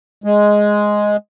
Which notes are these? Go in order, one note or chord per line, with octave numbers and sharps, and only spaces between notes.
G#3